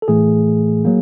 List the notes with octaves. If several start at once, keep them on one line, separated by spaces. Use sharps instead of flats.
A4
A2 E3 A3 G#4
F#3 A#3